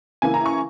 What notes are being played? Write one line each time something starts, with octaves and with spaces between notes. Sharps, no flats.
C#3 E3 A#3 E4 G#5
A#5
C#6